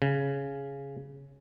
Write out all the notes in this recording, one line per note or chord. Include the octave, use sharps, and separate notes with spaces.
C#3